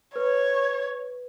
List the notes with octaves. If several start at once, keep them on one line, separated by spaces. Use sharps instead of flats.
B4 C#5